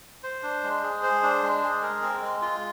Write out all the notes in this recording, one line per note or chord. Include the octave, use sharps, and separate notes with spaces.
C5
D4
G#3
G#4
C5
D4
G#3
G#4
A#4
C4
G#3
F4